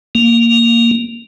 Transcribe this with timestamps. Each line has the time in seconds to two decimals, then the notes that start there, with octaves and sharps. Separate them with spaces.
0.15 A#3